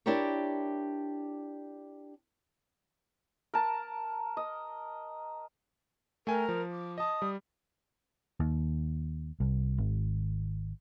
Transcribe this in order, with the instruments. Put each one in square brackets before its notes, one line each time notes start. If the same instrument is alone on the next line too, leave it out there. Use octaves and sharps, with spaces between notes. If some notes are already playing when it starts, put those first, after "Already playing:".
[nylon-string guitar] D4 E4 G4 A#4 C#5
[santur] A#4 A5
D#5
[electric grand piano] A3 G5 G#5 [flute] A#4
[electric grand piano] F3
[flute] D6
[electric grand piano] D#5 A5 [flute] D#6
[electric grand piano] G3
[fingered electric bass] D#2
C2
G#1